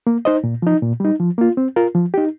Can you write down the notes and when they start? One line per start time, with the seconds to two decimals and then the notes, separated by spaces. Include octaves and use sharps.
0.07 A#3
0.25 D#4 C5 D#5
0.44 A#2
0.62 F3 D#4
0.82 A#2
1.00 G3 D#4
1.19 F3
1.38 A#3 F4
1.57 C4
1.76 F4 A#4
1.95 F3
2.14 D#4 G4